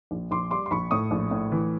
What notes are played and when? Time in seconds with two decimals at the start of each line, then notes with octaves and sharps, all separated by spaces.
0.11 A#1
0.31 A#1 C6 D6
0.51 G3 C6 D6
0.66 C6
0.71 A#1 B5 C#6
0.91 A2 C#6 D#6
1.11 A#1
1.31 A2
1.52 E3